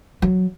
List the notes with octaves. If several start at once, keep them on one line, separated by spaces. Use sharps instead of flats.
F#3